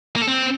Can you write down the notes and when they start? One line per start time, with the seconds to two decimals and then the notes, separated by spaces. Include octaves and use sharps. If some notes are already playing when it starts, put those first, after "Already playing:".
0.16 A#3
0.22 A4
0.28 C4